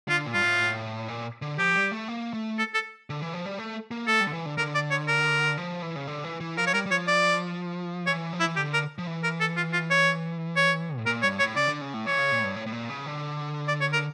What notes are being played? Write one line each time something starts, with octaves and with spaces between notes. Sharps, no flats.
D3 F4
A#2
G2 F4
A2
A#2
D3
F3 G4
G3
A3
A#3
A3
A4
A4
D3
E3
F3
G3
A3
A#3
A3 A4
G3
D3
E3
D3
D3 A#4
D5
C#5
A#4
F3
E3
C#3
D3
E3
E3
F3 A#4
C#5
G3 A#4
G3
F3 C#5
D5
E3 C#5
F3
E4
E3
D3 G4
A#4
F3
E3
A#4
A4
F4
F4
C#5
C#5
A2
A#2 A#4
G2 C#5
A2 C#5
C#3 D5
D3
C#3
A2
E3 C#5
C#3
A#2
A2
G2
A2
A2
A#2
C#3
D3
D5
C#5
A#4